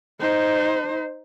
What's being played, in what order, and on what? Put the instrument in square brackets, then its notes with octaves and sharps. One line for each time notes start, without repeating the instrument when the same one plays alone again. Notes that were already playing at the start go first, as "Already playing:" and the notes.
[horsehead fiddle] D#4 C5